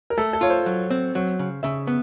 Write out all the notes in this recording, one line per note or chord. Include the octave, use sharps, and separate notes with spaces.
A#4
A3 A4
A4
F4 C#5
C5
F#3
C4
F#3
C#3
C#3 E5
B3